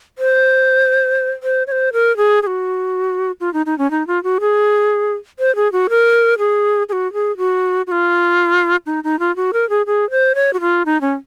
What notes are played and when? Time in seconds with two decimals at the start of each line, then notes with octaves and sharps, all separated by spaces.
0.18 C5
1.43 C5
1.67 C#5
1.72 C5
1.93 A#4
2.17 G#4
2.42 G#4
2.47 F#4
3.41 F4
3.54 D#4
3.66 D#4
3.78 C#4
3.91 D#4
4.07 F4
4.23 F#4
4.40 G#4
5.39 C5
5.56 G#4
5.72 F#4
5.90 A#4
6.38 G#4
6.89 G#4
6.92 F#4
7.13 G#4
7.37 F#4
7.87 F#4
7.92 F4
8.86 D#4
9.04 D#4
9.19 F4
9.36 F#4
9.53 A#4
9.70 G#4
9.86 G#4
10.11 C5
10.35 C#5
10.53 F#4
10.61 F4
10.86 D#4
11.01 C#4